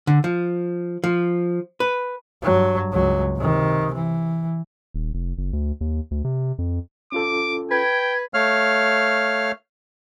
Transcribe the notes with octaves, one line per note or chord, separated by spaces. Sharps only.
D3
F3
F3
B4
G2 F#3
C#2 F#3
C3 D#3
E3
D#1
F1
F#1
D2
D#2
D2
C3
F2
C#4 F4 A4 D6
B4 G5 G#6
A3 C#5 F5 F6